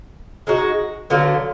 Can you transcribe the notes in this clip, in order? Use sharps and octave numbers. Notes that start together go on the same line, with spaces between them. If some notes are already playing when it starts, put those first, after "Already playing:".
G#3 D#4 F#4
D3 F#3 B3 F4